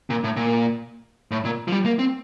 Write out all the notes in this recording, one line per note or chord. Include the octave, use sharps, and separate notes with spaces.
A#2
A2
A#2
A2
A#2
F3
G3
A#3
C4